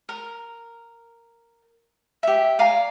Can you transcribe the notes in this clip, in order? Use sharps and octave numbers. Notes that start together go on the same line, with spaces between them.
A#4
G4 E5
D5 F5 G#5 A#5